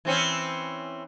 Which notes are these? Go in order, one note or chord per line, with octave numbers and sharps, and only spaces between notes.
E3 C4 C#4